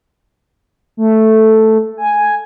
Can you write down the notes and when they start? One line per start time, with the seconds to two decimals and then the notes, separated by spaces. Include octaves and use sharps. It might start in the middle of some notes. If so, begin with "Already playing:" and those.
0.97 A3
1.97 G#5